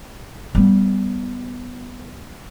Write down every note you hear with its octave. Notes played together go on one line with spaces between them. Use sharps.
G3 B3